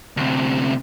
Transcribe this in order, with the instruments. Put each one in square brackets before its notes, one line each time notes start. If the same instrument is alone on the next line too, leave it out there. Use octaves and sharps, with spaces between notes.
[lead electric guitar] D2 C3